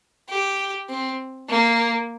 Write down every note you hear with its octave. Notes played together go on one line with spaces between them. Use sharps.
G4
C4
A#3